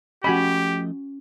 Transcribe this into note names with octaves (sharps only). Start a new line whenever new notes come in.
F3 A3 C#4 F#4 G4 D#5 G#5 B5